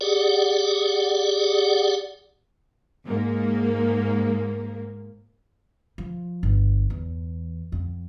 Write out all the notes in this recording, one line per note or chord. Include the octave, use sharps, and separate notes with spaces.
G4 G#4 D5 F#5
G#2 A#3
F3
G1
E2
F2